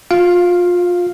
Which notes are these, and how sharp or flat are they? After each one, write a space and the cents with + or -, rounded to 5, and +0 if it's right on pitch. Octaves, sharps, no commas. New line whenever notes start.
F4 +25 F5 +0